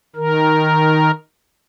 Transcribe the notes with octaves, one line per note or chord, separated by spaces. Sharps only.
D#3 A#4